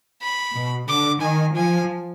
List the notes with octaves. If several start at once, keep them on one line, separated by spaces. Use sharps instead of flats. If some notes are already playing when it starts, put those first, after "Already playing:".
B5
B2
D3 D6
D#3 G#5
F3 G#5